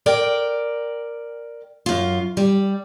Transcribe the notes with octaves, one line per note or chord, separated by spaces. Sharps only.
A#4 D5 G5
F#2 F4
G3